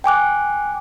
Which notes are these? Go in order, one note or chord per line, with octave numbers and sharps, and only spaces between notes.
G5 G#5 D6 F#6